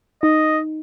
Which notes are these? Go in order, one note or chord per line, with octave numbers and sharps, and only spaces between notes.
D#4 D#5